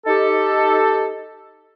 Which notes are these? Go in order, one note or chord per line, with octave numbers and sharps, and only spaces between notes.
D#4 G4 A4